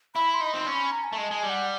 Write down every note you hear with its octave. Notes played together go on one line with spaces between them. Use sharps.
E4 B5
C6
D#4
B5
C4 C6
C#4
B5
A#5
G#5
A3 A5
G#3
G#3 G#5
G3
F#5